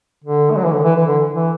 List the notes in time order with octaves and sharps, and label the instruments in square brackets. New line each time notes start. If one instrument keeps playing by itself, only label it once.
[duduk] D3
A3
F#3
E3
D3
E3
E3
D3
E3